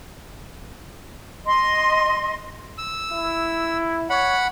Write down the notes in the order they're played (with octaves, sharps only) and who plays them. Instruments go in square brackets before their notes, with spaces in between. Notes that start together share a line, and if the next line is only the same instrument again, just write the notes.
[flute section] D#5 C6
[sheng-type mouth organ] E6
[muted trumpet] E4
[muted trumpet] C#5 [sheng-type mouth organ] F#5 B5